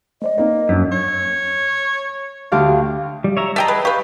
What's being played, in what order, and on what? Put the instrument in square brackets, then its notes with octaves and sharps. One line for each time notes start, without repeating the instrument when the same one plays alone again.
[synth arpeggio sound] A3 C5 D5 [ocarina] D#5
[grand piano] A#3 [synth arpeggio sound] C4 D#4 B4
[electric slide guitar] F#2 [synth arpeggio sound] D4 A#4 B6
[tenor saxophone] C#5
[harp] D2 G4 F5
[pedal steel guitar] G3
C#5 E5 A#5
[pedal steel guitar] G#4 D#5 A5 [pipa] E5 G5 A#5
[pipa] B4
[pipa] G4 B4 [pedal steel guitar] F5 C#6 G6